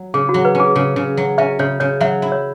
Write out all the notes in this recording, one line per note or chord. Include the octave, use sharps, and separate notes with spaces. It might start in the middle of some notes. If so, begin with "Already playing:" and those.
Already playing: F#3
C#3 G#4
F#4
F#3
B4
C#4
G#4
C#3
C#3
F#3
C#4 E5
C#3 C#5
C#3 C#5
F#3 E5
E4
C#5